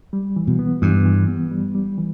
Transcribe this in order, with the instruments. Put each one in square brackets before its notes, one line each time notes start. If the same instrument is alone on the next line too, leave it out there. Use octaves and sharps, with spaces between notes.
[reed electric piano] G3
E3
[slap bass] B2
[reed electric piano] B3
[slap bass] G2 [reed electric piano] E3
[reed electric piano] E3
B3
G3
G3
E3